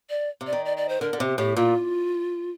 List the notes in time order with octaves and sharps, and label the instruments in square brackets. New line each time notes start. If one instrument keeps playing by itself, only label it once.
[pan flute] D5
[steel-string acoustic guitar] C3
[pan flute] D5
[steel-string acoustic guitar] D#3
[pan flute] D5
D5
C5
[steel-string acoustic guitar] D3 [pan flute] A#4
[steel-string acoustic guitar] D3
[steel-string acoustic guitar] C3 [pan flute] G4
[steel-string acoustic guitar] A2 [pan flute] G4
[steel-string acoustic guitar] A#2 [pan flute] F4